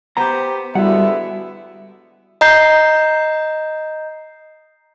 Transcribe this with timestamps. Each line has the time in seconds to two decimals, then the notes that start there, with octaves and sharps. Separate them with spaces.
0.17 B3 G4 C5 A#5
0.75 D3 G3 G#3 B3 E4 F#4 F#5
2.41 D#5 A#5 G6 C7